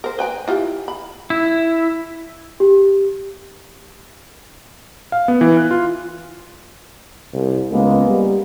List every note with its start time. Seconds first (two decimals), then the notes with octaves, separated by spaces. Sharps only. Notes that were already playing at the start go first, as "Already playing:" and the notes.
0.04 A#4 C5
0.19 B4 G5 G#5
0.48 E4 F4 G4
0.88 B5
1.30 E4
2.60 G4
5.12 F5
5.28 B3
5.41 E3
5.57 F#6
5.71 F4
7.33 C2
7.71 C#2 G#3 A#3 B3
8.08 G3